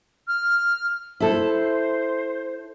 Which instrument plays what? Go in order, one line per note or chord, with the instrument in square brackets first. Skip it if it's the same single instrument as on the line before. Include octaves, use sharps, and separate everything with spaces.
[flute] F6
[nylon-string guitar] E4 A4 [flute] C5